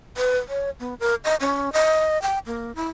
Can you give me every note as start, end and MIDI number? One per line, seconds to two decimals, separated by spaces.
0.17 0.38 71
0.48 0.70 73
0.80 0.94 59
1.00 1.15 70
1.24 1.36 75
1.40 1.73 61
1.73 2.21 75
2.22 2.38 79
2.46 2.75 58
2.75 2.88 64